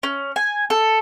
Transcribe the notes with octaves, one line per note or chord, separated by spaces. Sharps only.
C#4
G#5
A4